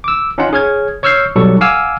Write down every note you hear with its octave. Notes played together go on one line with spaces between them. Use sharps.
D6 E6
C#4 D#4 F4 F#5
G#4 C#5 F6 G#6
C#5 C#6 E6 F6 G6 C7
B1 F#3 G3 A4 C#6
F5 F#5 G#5 D6 E6 F6